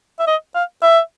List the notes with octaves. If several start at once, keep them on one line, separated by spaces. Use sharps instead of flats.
E5
D#5
F5
E5